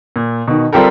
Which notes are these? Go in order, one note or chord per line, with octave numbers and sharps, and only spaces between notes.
A#2
B2 D#3
G3 C4 F4 G4 A4 A#4